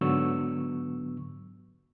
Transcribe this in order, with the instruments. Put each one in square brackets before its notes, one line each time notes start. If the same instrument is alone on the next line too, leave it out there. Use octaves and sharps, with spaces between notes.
[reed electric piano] G#2 D3 F#3 B3 C#6 E6